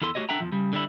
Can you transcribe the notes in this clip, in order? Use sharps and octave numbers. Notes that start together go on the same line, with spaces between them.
E2 E4 A4 C6
A3 F#4 G4 C#5 D#5
D4 A4 E5 F#5 G5 A#5
E2 D#3 F3
C#3 G3
D3 G3 E4